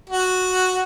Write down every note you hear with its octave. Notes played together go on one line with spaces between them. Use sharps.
F#4